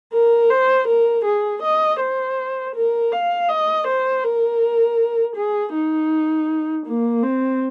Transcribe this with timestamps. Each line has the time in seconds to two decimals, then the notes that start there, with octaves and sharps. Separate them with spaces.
0.13 A#4
0.50 C5
0.88 A#4
1.25 G#4
1.62 D#5
2.00 C5
2.75 A#4
3.12 F5
3.49 D#5
3.87 C5
4.24 A#4
5.36 G#4
5.73 D#4
6.86 A#3
7.23 C4